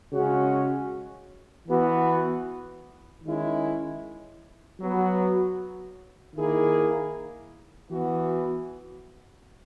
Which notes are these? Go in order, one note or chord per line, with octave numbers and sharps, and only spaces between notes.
C#3 G#3 C#4 F#4
E3 B3 F#4
D#3 G#3 C#4 E4
F#3 B3 F#4
D#3 A#3 E4 G#4
E3 B3 F#4